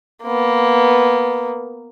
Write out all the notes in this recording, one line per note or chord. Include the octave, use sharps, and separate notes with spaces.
A#3 B3